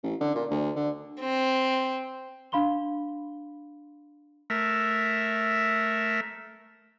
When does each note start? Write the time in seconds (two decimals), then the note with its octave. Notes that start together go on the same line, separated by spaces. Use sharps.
0.03 A1
0.21 D3
0.35 A#2
0.50 D2
0.76 D3
1.21 C4
2.52 D4 F5 B5 C6 G7
4.50 A3 A#4 E5